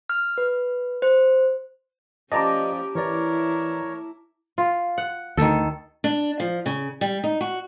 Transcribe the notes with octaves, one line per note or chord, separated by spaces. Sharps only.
F6
B4
C5
F3 C#4 G4 D5 D#5 A5 A#5 D6
E3 E4 A#4 C#5 D5
F4
F#5
D2 D#3 A4
D4
F3
C#3
G3
D#4
F#4